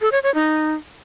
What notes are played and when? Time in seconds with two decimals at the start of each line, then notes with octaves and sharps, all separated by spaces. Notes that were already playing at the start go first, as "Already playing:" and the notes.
0.01 A4
0.12 C#5
0.23 C#5
0.35 D#4